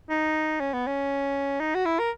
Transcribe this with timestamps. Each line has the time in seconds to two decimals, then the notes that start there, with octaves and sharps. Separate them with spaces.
0.10 D#4
0.60 C#4
0.73 B3
0.87 C#4
1.60 D#4
1.75 F#4
1.85 E4
2.00 A#4